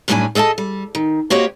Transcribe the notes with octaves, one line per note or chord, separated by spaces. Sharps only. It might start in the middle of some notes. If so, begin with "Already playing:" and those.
F#2 A2 G3 C#4 D4 G#5
G#4 A4 D#5 F5 A5
G3
D#3
A#3 F#4 G4 C5 C#5 D#5